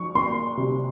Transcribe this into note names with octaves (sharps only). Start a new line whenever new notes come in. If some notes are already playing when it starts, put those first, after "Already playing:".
Already playing: F3 C#6
A#3 C6
C3